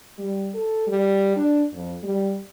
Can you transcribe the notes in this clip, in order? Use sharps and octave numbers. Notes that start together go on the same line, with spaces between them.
G3
A4
G3
D4
F2
G3